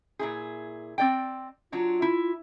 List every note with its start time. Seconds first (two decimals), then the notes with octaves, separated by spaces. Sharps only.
0.19 A#2 E4 G#4
0.98 C4 D5 G5
1.72 F#3 D4 F4 C#5
2.02 E4